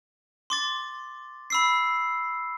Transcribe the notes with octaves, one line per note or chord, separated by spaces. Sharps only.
C6 D6 A6
B5 E6 C7